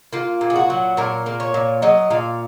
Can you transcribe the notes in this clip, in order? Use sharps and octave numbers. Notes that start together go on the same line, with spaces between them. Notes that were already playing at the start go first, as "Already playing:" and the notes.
A#3 F4
A#2
G#4
F#4
F#3
A#2 A#4
A#3
C#5
A#2
F#3 D#5
A#2 F5